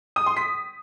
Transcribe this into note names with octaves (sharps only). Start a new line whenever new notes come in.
D#6
C6
B6